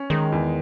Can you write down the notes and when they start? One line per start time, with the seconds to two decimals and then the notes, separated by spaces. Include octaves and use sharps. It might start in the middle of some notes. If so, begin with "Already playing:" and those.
Already playing: C#4
0.10 D#3 G#3
0.32 E2